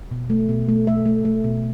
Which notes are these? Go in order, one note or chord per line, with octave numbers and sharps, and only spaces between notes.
B2
A3
B2
A3
A3 E5
A3
A3
B2